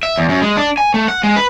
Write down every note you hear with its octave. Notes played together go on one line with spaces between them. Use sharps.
E5
E2
F#2
G#3
D4
G#5
A3
F#5
G#3
B4